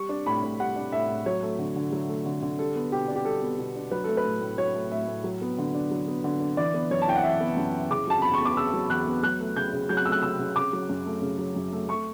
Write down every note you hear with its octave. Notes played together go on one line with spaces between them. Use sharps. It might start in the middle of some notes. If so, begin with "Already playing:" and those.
Already playing: G3 C#6
D4
A2 B5
A2
G3 F#5
D4
A2 E5
A2
F#3 C#5
A3
D3
D3
F#3
A3
D3
D3
G3 A4
B3
B2 G4
D4
G4
G3 A4
B3
B2
D4
F#3 B4
A3 A4
B4
A2
A2
F#3 C#5
A3
A2 E5
A2
F#3
B3
D3
D4
F#3
B3
D3
D4
E3 D5
B3
F#2 C#5
A5
E4 G5
F#5
E3 E5
B3
F#2
E4
C#3 D6
F#3 A5
E2 B5
C#6
B3 D6
C#3 E6
F#3
E2 F#6
B3
F#3 F#6
A3
C#3 G6
C#3
F#3 G6
F#6
A3 E6
F#6
C#3 E6
C#3
C#3 D6
F#3
F#2
A3
C#3
F#3
F#2
A3
A3 C#6